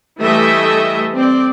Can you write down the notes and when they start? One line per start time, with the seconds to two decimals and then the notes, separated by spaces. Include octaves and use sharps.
0.20 E3 G3 A3 A4 D#5 E5
1.13 C4 D5